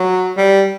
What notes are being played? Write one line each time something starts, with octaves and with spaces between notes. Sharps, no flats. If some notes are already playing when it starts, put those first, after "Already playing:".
Already playing: F#3
G3